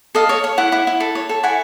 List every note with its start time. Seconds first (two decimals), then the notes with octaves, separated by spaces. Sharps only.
0.15 A4 D#5 F5
0.29 C#5
0.44 C#5
0.58 E4 E5 F#5
0.72 E4
0.87 E4
1.00 A4
1.15 C#5
1.29 A4
1.43 E4 F#5 G#5